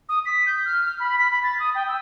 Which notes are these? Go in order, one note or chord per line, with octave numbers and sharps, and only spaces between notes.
D#6
B6
G6
F6
F6
B5
B6
B5
A6
D#6
G5
E6